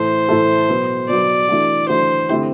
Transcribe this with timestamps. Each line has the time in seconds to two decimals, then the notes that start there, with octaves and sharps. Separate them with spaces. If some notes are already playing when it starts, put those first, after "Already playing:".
Already playing: A2 E3 A3 E4 A4 C5
0.29 A2 E3 A3 E4 A4
0.69 B2 F#3 B3
1.09 B2 F#3 B3 D5
1.49 E3 A3 D4 F#4
1.89 E3 A3 D4 F#4 C5
2.29 D3 A3 C4 E4 G4